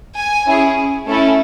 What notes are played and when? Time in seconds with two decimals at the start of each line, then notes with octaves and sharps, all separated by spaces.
0.17 G#5
0.47 C#4 E4 G#4
1.06 A3 C#4 E4 A4